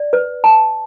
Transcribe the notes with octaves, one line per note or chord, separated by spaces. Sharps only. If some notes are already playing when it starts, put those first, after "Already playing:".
Already playing: D5
B4
A5